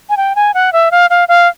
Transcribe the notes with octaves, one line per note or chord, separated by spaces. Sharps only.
G#5
G5
G#5
F#5
E5
F5
F5
F5